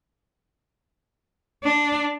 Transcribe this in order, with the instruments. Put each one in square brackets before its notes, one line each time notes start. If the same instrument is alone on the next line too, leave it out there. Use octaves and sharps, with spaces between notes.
[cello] D4